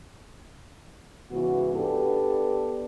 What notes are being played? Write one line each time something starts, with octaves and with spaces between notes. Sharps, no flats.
G#2 C#3 E3 B3 F#4
B3 D4 G4 A4 B4